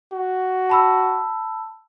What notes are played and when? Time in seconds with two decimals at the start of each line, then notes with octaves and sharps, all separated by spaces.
0.13 F#4
0.70 A5 B5 E6